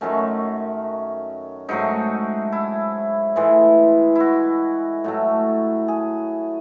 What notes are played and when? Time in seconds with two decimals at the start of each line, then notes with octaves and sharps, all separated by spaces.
0.01 F#2 D#3 F#3 A3 C#4
1.69 G#2 F#3 A3 D#4
2.52 E4
3.36 A2 E3 G#3
4.15 E4 F#4
5.04 A2 F#3 A3
5.88 G#4